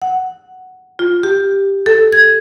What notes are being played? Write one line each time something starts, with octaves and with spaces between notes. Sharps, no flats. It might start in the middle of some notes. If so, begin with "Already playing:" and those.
F#5
F4
G4
A4
G#6